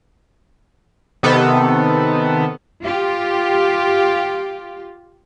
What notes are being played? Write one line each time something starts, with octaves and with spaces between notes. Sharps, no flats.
C3 D#3 B3 A4
F4 G4